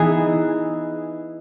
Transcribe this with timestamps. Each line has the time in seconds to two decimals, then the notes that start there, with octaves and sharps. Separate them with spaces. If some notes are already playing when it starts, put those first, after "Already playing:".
Already playing: E3 B3 D#4 G#4